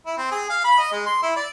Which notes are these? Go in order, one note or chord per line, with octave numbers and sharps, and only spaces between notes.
E4
C4
G#4
F5
B5
D#5
G#3
C6
E4
D5